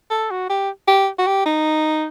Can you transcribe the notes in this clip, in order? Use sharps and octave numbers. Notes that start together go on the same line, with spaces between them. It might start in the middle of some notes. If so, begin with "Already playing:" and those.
A4
F#4
G4
G4
F#4
G4
D#4